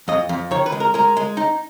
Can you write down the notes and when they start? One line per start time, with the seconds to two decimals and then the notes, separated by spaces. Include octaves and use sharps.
0.08 F2 D#5
0.29 F2
0.51 D#3 C#5
0.66 B4
0.72 G#3
0.80 A#4
0.94 G#3 A#4
1.17 G#3
1.37 D#4